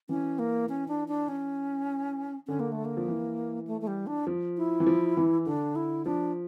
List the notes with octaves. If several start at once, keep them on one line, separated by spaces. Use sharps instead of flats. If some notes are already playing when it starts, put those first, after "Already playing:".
E3 C#4
A#3
C#4
D4
D4
C#4
D3 C#4
A#3
A3
A#3
F3
E3
A3
A3
G3
D4
F3
E4
E3
F3
E3
D3 D4
E4
F3 D4